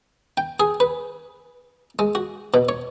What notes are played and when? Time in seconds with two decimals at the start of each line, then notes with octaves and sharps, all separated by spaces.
0.37 G5
0.60 G#4
0.80 B4
1.99 G#3
2.15 F#4
2.54 B2
2.69 C#5